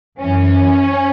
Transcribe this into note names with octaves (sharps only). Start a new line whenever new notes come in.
F#2 E3 C#4